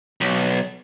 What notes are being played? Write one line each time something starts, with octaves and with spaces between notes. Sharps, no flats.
B1